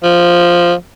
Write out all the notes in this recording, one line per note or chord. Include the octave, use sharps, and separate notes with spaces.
F3